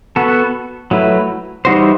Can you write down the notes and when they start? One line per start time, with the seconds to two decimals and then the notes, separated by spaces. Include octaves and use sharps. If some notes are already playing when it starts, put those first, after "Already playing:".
0.16 B3 F#4 A4
0.91 F#3 A3 E4 B4
1.65 E3 G3 D#4 F#4 C5